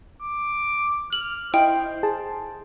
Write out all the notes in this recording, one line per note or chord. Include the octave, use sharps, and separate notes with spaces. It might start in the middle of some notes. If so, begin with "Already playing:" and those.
D6
F6 F#7
E4 C5 D#5 G5
G#4 A5